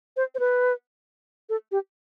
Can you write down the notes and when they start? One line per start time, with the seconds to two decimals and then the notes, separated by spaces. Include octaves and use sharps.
0.17 C5
0.35 C5
0.39 B4
1.49 A4
1.72 G4